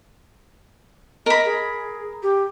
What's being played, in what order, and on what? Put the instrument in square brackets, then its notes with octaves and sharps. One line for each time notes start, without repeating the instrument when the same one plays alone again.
[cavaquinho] A#4 B5 [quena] D#5
[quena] G#4
G4